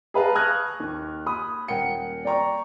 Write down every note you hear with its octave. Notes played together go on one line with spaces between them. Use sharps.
G#4 B4 F5 A5 A#5
C#6 D#6 F6 F#6 G#6 A#6
D#2
B5 D#6
D#1 A#4 F#5 G5 C#7
D5 G5 A#5 C#6